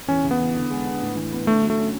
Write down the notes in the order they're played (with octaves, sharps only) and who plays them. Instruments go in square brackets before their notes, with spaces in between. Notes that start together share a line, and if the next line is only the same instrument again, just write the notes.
[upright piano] E2 [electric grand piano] C#4
[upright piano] C#3
[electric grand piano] B3
[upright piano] E3
D3
G#3
D4
A2
E3
B3
[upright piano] D3 [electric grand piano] A3
[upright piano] F#3
[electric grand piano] A3
[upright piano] C#4